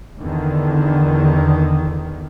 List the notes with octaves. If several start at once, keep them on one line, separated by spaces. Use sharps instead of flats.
E2 D3 D#3